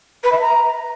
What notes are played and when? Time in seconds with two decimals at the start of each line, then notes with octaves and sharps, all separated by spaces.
0.23 B4
0.32 E5
0.40 A#5